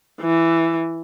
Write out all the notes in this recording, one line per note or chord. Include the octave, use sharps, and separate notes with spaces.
E3